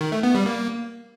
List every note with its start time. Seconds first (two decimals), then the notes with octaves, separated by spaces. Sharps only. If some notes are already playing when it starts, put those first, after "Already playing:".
0.01 D#3
0.12 A3
0.23 B3
0.35 G3
0.46 A#3